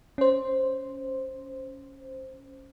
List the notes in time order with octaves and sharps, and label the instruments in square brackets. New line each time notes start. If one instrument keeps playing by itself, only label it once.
[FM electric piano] C#4 C5